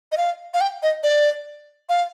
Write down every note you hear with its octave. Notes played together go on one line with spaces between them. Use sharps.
D#5
F5
F5
G5
D#5
D5
F5